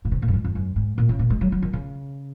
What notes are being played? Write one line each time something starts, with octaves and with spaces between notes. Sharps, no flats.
A#2
C3
A#2
F#2
G#2
F2
F#2
G#2
A#2
C#3
A#2
G#3
F#3
F#3
D#3
C#3